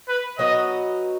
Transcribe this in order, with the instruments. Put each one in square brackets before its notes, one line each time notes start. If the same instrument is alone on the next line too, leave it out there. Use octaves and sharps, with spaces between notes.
[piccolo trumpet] B4
[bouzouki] F#3 B3 D#4 F#4 [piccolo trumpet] D#5